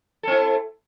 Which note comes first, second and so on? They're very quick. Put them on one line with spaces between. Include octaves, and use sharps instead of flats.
A4 C4 E4